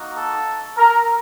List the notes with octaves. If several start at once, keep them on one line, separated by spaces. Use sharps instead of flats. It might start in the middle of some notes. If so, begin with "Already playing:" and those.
Already playing: A#3 D#4 F#4
A4
A#4